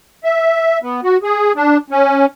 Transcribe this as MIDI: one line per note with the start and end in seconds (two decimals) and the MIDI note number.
0.24 0.78 76
0.82 1.01 59
1.04 1.17 66
1.23 1.52 68
1.56 1.77 62
1.90 2.26 61